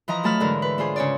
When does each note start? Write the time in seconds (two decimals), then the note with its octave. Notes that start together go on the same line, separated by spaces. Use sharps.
0.08 E3 F3 D#5 A#5
0.23 F#3 A3 A5 B5 F6
0.40 G#2 D3 E3 A#4
0.62 B4
0.78 D4 F4 G#4 C5
0.96 C#3 C#5 D5